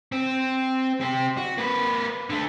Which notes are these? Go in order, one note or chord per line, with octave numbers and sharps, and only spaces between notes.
C4
C4 G4
F#4
A#3 B4
D3 A3